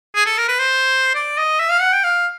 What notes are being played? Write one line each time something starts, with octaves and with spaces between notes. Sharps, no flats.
G#4
A4
A#4
B4
C5
D5
D#5
E5
F5
F#5
G5
F5